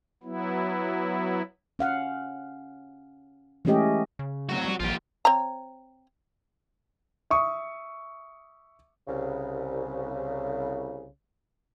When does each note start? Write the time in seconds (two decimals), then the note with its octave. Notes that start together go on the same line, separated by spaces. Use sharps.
0.23 F#3 B3 E4
1.79 C#4 F5 F#5
3.65 E3 G#3 A3 C#4 G4 D#5
4.19 C#3
4.49 F#2 A2 F#3 C4 F#4
4.65 G3
4.80 A1 G2 A#2 F3 F4 G4
5.25 C4 C#5 A#5
7.30 E5 C#6 D#6
9.08 C2 C#3